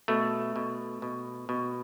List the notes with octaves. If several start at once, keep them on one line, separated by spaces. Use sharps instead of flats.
B2 A3
B2
B2
B2